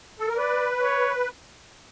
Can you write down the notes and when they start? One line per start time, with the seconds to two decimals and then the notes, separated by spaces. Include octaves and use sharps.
0.19 A4
0.28 A#4
0.37 B4 D5
0.81 C#5